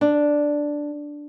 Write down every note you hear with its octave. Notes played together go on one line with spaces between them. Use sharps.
D4